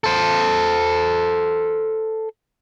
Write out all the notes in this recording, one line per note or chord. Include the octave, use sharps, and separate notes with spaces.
A4 C5